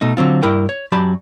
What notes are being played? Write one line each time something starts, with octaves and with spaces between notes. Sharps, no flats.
B2 A3 D#4
D3 F#3 C4 F4
G2 E4 A#4 G5
C#5
F#2 F#3 G4 D5 A5 B5